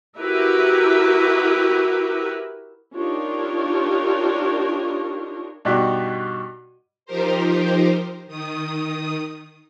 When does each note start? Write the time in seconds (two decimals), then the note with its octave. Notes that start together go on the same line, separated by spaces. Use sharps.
0.18 E4 F#4 G4 A#4 B4 E5
2.95 D4 D#4 F4 G4 A#4 C#5
5.65 G2 B2 D4 D#4 F#4 G4
7.06 F3 D#4 G4 A#4 C5
8.27 D#3 D#6